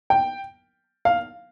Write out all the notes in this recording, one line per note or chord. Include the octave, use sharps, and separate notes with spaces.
G5
F5